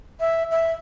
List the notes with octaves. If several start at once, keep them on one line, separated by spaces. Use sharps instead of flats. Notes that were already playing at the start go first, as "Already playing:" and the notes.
E5
E5